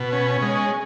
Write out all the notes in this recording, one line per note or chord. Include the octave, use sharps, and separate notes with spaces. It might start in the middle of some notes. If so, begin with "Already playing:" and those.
Already playing: B2
C#4
G#3